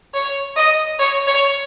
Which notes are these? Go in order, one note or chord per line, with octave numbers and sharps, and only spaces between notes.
C#5
D#5
C#5
C#5